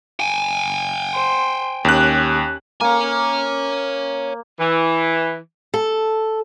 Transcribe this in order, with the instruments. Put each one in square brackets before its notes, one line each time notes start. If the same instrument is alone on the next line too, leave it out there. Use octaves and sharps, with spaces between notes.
[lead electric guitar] G5 G#5
[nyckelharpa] C5
[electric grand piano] D#2 F#6 [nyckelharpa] C#4 G4
[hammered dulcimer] A#3 [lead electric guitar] C#5 G#5
[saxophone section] E3
[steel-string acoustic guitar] A4